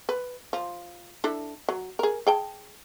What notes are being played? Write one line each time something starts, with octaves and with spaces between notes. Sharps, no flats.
B4
F3
D4 E4 A4
F#3
G#4 A#4
G#4 G5 A5